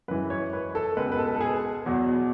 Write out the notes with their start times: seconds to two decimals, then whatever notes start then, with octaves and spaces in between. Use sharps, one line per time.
0.08 F#2 E3 G#3 B4
0.30 C#5
0.53 B4
0.75 A4
0.97 C#2 B2 G#3 B4
1.12 B4
1.19 A4
1.36 A4
1.41 G#4
1.85 E2 B2 F#3